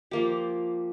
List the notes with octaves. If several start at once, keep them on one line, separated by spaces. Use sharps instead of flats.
F3 A#3 G4